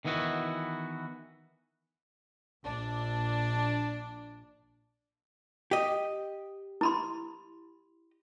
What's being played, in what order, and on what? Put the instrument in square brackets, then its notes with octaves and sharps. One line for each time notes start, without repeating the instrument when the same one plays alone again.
[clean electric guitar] D#3 E3 B3 E4 F#4
[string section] A#1 D4
[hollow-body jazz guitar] G4 D#5
[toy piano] E4 B5 C6